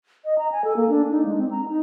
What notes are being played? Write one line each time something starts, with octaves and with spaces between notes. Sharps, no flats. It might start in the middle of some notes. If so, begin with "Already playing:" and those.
D#5
A#5
G#5
A4
A#3
D4
D#4
G#3
C4
A#5
D#4